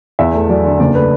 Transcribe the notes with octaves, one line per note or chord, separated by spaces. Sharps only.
E2 E5
A3
F#3 D5
D3
F#1 D5
A3 B4